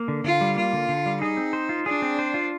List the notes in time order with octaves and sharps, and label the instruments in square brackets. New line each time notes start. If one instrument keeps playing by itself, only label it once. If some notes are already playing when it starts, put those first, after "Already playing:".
Already playing: [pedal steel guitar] A#3
D3
[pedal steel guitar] D3 [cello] F4
[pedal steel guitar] G3
[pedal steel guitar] A#3 [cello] F4
[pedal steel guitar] D3
D3
G3
[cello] D#4 [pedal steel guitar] G#4
[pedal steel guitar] C4
C5
F4
[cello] D4 [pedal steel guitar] G#4
[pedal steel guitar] C4
C5
F4